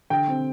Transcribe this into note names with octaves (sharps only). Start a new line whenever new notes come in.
D3 G5
C4